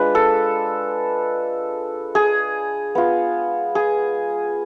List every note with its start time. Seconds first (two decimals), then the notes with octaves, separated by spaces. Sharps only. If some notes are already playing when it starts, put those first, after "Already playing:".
Already playing: G#3 D4 F4 B4
0.15 A4
2.15 G#4
2.95 B3 F4
3.75 G#4